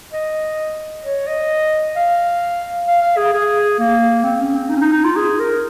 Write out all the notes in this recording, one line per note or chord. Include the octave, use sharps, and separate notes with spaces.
D#5
C#5
D#5
F5
F5
F5
G#4
G#4
A#3
C4
C#4
C4
D#4
C#4
D#4
D#4
F4
G#4
A#4